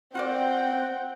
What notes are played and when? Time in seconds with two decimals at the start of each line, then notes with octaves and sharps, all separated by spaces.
0.15 C4 F4 F#4 D5 F#5 G5